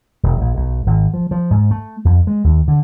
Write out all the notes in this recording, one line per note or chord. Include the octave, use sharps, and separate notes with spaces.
E1
A#1
B1
G#1
F3
F3
G#2
A3
F2
G#3
D#2
D3